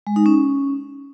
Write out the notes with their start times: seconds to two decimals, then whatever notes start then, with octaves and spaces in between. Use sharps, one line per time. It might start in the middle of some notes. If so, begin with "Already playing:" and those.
0.07 G#3
0.16 D#4
0.26 C#4